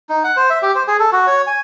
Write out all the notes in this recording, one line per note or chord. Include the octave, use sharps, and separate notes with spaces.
D#4
F#5
C5
E5
G4
C5
G#4
A4
F#4
C#5
G#5